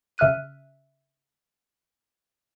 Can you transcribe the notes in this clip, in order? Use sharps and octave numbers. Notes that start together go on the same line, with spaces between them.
C#3 E5 F6 F#6 D#7